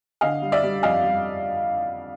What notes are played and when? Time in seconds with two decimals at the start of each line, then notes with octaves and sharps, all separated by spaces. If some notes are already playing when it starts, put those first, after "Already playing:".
0.21 D3 D#5 F5
0.42 G3
0.52 D5 E5
0.63 G3
0.83 F2 D#5 F5
1.03 G3